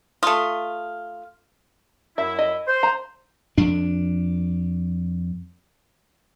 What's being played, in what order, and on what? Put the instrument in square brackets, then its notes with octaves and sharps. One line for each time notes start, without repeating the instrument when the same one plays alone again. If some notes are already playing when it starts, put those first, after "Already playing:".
[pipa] A3 F4 [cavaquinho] D#6
[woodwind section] F#2 E4 [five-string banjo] E5
[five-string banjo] D#5
[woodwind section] C5
[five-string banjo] A#5
[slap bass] F2 D4